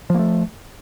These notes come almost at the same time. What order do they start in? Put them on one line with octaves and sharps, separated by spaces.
F3 A#3 A3